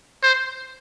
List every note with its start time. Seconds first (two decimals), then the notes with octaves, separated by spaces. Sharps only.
0.23 C5